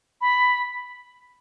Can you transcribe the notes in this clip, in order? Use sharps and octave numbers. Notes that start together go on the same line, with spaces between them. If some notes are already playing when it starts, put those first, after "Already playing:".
B5